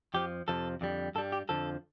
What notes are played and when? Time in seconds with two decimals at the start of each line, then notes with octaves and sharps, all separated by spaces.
0.14 F2 F3 G4
0.48 F2 C3 F3 A4
0.81 F2 D3 G3
1.15 G2 A4
1.18 G3
1.32 G4
1.49 F2 D3 F3 A4